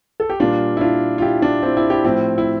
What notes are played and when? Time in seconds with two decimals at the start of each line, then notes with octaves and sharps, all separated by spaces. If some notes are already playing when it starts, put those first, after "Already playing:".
0.20 A4
0.30 G4
0.40 A#2 G3 D4 F4
0.77 E4
0.81 D4 F4
1.18 F4
1.22 E4 G4
1.42 D4 F4
1.63 C4 E4
1.77 E4 G4
1.90 E4 G4
2.05 A2 F3 C4 E4
2.38 E4